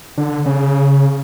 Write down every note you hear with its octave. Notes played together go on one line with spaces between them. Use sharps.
D3
C#3